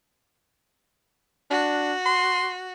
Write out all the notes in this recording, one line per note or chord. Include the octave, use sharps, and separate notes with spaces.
D4 F#4
C6